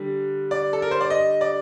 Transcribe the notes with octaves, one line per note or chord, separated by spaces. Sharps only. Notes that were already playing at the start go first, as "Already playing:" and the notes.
Already playing: D3 G3
D5
A4
A#4
C5
D5
D#5
D5